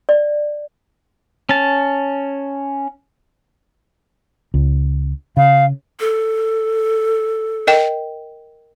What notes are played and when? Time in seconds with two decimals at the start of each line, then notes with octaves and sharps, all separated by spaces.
0.09 D5
1.49 C#4 A5
4.54 C#2
5.37 C#3 F5
6.00 A4
7.67 A#4 D#5 G5